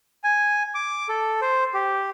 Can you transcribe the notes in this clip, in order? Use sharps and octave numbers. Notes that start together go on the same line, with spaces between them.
G#5
D6
A4
C5
G4